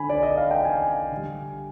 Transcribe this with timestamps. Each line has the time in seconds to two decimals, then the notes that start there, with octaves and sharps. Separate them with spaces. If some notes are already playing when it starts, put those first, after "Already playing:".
Already playing: D3 G#5 B5
0.10 D5
0.23 D#5
0.37 F5
0.51 G5
0.65 G#5
1.12 D3 G3